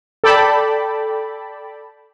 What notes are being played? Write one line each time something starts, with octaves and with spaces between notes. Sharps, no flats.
A4 D5 G5 A5 B5 D6